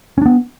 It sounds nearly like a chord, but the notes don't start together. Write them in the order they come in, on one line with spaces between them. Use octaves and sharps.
C#4 D4 B3